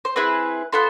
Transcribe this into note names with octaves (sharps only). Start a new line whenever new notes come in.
C5
C4 E4 G#4 B4
B3 F4 A4 C5